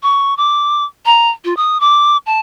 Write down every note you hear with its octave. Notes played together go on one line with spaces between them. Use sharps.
C#6
D6
A#5
F4
D#6
D6
A5